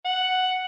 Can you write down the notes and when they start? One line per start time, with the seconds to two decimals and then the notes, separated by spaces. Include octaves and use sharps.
0.06 F#5